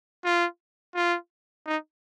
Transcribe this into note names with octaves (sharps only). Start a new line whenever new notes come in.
F4
F4
D#4